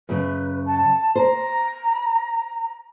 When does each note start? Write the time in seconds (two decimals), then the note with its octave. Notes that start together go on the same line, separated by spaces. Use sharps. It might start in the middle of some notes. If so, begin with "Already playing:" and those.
0.09 F#2 C#3 B4
0.65 A5
1.15 C5 A#5